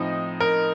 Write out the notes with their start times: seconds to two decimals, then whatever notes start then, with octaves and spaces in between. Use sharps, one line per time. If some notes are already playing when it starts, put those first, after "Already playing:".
Already playing: A2 F3 C4 D#4
0.40 A#4